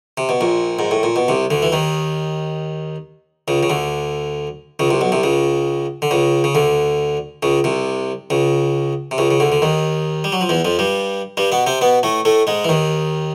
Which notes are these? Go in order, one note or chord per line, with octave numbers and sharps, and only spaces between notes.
C3
B2
A#1 A#2
G#2
A2
A#2
B2
C2 C3
D2 D3
E3
D#2 D#3
C#2 C#3
C#3
D2 D3
C#2 C#3
C2 C3
B1 B2
C2 C3
C#2 C#3
D3
C#2 C#3
C#3
D2 D3
C#2 C#3
C2 C3
C#2 C#3
C3
C#2 C#3
C#3
D2 D3
D3
D#2 D#3
G3
F#3
F3
E2 E3
F2 F3
G2 G3
G2 G3
B2 B3
C3 C4
B2 B3
A2 A3
A2 A3
G#2 G#3
E3
D#2 D#3